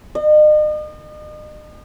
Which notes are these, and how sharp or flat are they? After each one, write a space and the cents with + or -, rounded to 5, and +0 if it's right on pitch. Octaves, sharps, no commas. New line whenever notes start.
D#5 -40